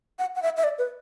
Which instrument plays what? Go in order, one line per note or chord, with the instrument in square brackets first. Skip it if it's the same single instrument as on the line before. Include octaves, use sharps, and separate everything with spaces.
[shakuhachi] F#5
F#5
E5
E5
D5
B4